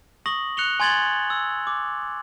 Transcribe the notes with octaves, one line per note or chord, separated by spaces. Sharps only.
C#6 D#6 A#6 F#7
F#6 C#7 F7 G7
G#5 C6 G#6 A6 F#7 G7
E6
D6